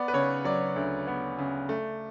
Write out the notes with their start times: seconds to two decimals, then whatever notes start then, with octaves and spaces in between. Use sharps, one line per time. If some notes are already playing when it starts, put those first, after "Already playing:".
Already playing: B3 D5
0.08 B4
0.13 C#3 C#5
0.45 F#3 D5
0.76 D2
1.07 B3
1.38 C#3
1.69 A3